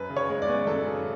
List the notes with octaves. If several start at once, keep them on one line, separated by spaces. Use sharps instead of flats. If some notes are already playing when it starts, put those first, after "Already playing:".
Already playing: F#2 B4
C#3
C#5
G#3
D5
B3
F#2 A4
C#3